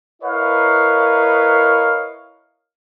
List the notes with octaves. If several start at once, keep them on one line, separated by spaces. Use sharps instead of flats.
E4 A#4 B4 C#5 D#5 F5